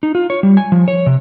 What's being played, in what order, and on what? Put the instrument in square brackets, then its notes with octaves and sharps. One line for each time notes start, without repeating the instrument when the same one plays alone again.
[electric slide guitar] D#4
F4
C#5
G3
G#5
F3
C#5
C3